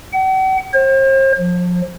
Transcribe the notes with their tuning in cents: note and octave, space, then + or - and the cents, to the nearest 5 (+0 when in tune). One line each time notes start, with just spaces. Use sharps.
F#5 +45
C5 +40
F3 +30